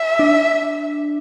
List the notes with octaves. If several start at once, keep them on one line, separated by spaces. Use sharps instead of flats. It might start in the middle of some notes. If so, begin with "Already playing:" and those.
Already playing: E5
D4